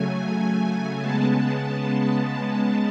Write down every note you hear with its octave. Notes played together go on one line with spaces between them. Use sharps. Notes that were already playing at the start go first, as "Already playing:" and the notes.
Already playing: C#3 F#3 A3 G#5
G#5
C#3 G#3 B3 A5